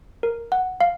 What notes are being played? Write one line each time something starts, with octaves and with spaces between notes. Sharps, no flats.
A#4
F#5
F5